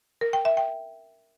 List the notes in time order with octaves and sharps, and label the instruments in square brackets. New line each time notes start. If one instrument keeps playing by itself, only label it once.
[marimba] A#4
G5
E5
G5